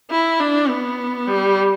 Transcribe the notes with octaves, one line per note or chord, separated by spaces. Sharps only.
E4
D4
B3
G3